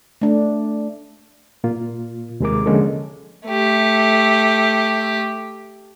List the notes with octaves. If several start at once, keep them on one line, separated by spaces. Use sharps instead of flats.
A3 D4
A#2 A#3 F4
D#2 C3 G#3 G#4 A#4 D6
D3 F3 G#3 A#3 C#4 A4
A3 G4